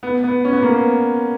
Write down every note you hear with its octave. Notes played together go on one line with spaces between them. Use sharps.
B3
B3
C#4
B3
A#3
B3